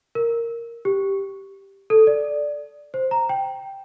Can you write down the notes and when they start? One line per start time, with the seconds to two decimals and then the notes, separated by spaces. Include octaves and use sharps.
0.15 A#4
0.85 G4
1.90 A4
2.07 D5
2.94 C5
3.11 A#5
3.29 G5